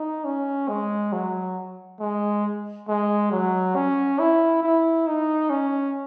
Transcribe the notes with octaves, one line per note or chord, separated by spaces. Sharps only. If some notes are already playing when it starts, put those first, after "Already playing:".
Already playing: D#4
C#4
G#3
F#3
G#3
G#3
F#3
C#4
E4
E4
D#4
C#4